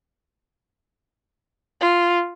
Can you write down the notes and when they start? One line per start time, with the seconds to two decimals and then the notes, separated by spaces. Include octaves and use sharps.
1.81 F4